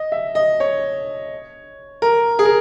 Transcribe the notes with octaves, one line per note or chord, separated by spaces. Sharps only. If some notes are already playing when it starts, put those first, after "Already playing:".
Already playing: D#5
E5
D#5
C#5
A#4
G#4
A#4